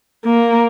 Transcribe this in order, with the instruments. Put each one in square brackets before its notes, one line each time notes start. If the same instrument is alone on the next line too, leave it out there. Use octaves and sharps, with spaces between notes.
[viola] A#3